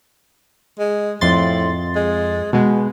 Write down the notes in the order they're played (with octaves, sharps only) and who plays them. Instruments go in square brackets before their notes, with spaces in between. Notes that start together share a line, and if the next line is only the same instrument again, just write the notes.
[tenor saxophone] G#3
[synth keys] F2 C6 A6 [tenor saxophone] A2
[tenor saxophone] G#3
[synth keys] B2 G#3 [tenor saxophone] B3